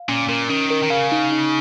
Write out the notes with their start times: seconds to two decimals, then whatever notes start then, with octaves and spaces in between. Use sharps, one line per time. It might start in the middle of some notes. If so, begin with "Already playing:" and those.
Already playing: F5
0.09 A#2 C#4
0.29 A#2 A#4
0.49 D#3 C#4
0.70 A#4
0.83 D#3
0.90 C#3 F5
1.12 D#4
1.32 D#4